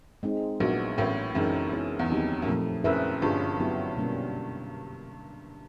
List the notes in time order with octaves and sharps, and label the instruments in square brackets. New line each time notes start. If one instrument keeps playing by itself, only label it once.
[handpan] G#3 C4 D#4
[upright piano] A#1 A#2 [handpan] F#3 B3 D4 F#4
[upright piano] A1 A2 [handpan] C#4 F#4 A#4 C#5
[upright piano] F#1 F#2 [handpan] E3 G#3 C4 D#4 G#4
[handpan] B3 E4 G#4 C#5
[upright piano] E2
[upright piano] F2 [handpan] D#3 F#3 A#3 D#4 G4
[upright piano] F#2
[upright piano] F2 [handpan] A#2 F3 A3
[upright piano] F#1 F#2 [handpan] C4 E4 G#4 B4 E5
[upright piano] G1 G2 [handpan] C#4 F4 G#4
[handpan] F#3 B3 E4 G4
B2 G3 A#3 C#4